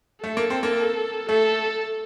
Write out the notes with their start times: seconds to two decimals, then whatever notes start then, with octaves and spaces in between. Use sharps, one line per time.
0.23 A3 A4
0.37 A#3
0.50 C4
0.63 A#3
1.29 A3 A4